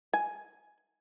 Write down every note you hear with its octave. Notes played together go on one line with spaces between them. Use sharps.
G#5